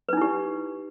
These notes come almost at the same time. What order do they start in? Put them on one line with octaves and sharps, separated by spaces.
B4 D#4 E4 G4